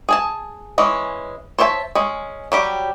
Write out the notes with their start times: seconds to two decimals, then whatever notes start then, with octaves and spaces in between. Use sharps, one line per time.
0.09 G#4 G#5 A5
0.78 E3 G#3 C#4
1.59 C5 C#5 E5 G5 A5
1.95 G#3 C#4
2.52 F#3 G3 G4